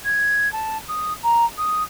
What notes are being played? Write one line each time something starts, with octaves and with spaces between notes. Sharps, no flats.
G#6
A5
D#6
A#5
D#6